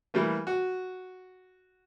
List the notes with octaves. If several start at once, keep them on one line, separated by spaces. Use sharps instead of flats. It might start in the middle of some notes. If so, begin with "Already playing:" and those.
E3 G3 A3 A#3
F#4